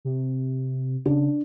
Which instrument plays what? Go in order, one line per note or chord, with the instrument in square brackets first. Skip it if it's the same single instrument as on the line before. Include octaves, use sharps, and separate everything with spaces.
[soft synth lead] C3
[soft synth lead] C#3 [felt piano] D4